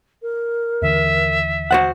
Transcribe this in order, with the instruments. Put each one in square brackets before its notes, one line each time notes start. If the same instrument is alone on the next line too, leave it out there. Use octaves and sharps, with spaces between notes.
[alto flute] A#4
[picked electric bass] D#2 D3 E3 [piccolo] E5
[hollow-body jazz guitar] F#4 C5 F#5